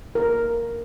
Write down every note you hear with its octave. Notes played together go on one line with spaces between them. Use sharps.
A#4